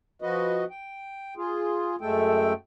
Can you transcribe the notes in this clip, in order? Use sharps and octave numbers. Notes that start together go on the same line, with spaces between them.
F3 F#4 B4 D#5
G5
F4 G#4
F#2 G#3 A3 A4 G5